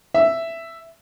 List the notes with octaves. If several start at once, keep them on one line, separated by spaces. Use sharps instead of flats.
E5